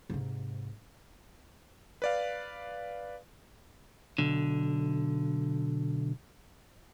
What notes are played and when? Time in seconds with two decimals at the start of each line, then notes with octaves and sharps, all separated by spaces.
0.09 G#2 C3
2.02 B4 D5 F5
4.18 B1 D3